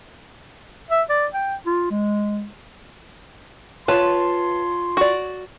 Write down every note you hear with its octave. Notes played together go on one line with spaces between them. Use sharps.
E5
D5
G5
F4
G#3
F4 B4 C#5 A5 C6
F#4 D5